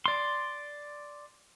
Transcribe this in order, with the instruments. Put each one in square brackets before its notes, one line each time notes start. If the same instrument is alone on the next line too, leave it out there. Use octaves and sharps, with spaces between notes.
[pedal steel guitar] D5 C6